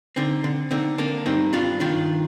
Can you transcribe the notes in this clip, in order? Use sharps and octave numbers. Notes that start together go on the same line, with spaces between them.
D3 C4 D#4
D3
D3 C4 D#4
D3 A#3 D4
G2 C4 D#4
G2 D4 F4
D#3 D4 F4